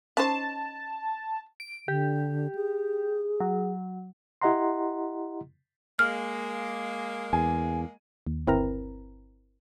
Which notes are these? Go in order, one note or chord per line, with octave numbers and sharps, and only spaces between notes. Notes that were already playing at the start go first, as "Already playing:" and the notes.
C#4 D#4 C5 A5
D7
D3 G4
G#4
F#3
E4 G4 D#5 F#5 A#5 C6
G#3 A#3 F6
E2 G#5
D#2
G1 C4 E4 A#4 B4 A#5